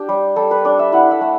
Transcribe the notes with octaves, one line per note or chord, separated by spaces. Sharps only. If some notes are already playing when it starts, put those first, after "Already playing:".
Already playing: D4 G4
G3
G3 A4
B4
D4 D5
E5
E4 F#5
E5
A3